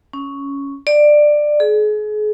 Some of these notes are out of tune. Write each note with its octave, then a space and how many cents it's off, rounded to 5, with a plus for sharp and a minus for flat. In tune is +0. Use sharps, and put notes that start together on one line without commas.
C#4 +5
D5 +15
G#4 +35